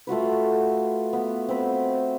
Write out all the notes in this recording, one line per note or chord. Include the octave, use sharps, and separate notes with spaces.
A3 F4 F#4 B4
B3
C4 B4